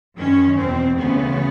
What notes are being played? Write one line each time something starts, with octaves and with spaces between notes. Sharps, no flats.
F#2 D#3 C#4
E2 B2 C4
D2 C#3 E3 B3